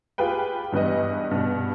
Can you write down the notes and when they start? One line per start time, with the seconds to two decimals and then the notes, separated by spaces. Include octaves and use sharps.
0.18 F4 G4 G#4 B4 G5
0.72 E2 G2 G3 B4 D#5
1.31 G2 B2